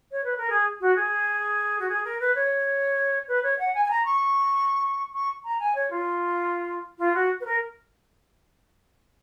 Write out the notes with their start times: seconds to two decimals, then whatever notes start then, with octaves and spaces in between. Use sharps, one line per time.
0.12 C#5
0.24 B4
0.38 A#4
0.50 G#4
0.81 F#4
0.96 G#4
1.79 F#4
1.89 G#4
2.04 A#4
2.20 B4
2.35 C#5
3.28 B4
3.43 C#5
3.59 F#5
3.75 G#5
3.85 G#5
3.90 A#5
4.05 C#6
5.14 C#6
5.45 A#5
5.60 G#5
5.75 C#5
5.91 F4
6.99 F4
7.14 F#4
7.41 B4
7.45 A#4